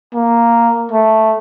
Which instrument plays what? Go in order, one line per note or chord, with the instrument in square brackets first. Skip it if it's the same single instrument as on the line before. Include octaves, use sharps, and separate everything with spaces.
[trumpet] A#3
A3